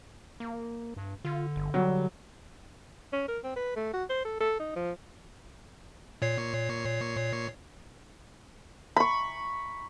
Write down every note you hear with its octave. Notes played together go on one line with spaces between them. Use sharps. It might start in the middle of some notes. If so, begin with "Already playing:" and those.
A#3
G2
D3 F4
G1
F#3 G3
C#4
A#4
C4
B4
A3
F#4
C5
A4
A4
D#4
F3
A#2 C#5 C7
B5 C#6